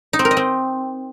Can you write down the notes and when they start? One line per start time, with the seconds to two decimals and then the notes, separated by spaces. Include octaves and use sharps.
0.13 D#4
0.19 C4
0.25 A#4
0.31 D#5
0.37 C4